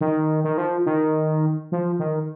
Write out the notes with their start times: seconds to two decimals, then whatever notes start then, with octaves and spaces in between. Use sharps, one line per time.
0.01 D#3
0.44 D#3
0.58 F3
0.86 D#3
1.72 F3
1.99 D#3